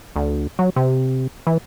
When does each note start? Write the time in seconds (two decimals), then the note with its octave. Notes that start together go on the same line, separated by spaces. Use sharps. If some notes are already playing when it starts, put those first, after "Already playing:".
0.16 D2
0.59 F#3
0.76 C3
1.47 E3